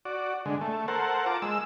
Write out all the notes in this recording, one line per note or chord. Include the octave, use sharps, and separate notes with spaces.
F#4 D5
D3 G#3
A3
A4 A#4 C5 F#5
F4 A5 A#5 D6
G#3 E6